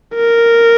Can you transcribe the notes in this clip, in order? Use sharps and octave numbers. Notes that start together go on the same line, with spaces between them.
A#4